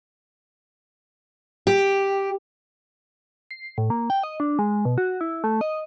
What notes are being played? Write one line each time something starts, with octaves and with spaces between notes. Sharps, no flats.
G4
C7
A2
A#3
G5
D#5
D4
G#3
B2
F#4
E4
A3
D#5